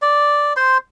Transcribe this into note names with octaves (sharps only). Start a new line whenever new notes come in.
D5
C5 C6